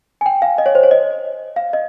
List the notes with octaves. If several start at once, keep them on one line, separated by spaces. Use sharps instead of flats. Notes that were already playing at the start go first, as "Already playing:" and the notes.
G#5
G5
F5
D#5
C#5
C5
C#5
D#5
F5
D#5